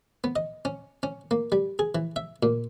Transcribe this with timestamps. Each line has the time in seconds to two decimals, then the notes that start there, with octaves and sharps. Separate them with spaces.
0.24 B3
0.36 D#5
0.65 C#4
1.03 C#4
1.31 A#3
1.52 G3
1.79 G#4
1.95 E3
2.16 E5
2.43 A#2